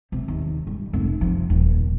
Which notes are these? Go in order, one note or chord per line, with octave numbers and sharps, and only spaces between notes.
C3
D#2
G3
F1
F3
D#1